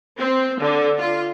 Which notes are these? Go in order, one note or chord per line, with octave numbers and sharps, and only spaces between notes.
C4
D3
F4